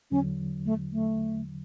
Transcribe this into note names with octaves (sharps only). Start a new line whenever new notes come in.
E2 D3 F#3 C#4
A3
A3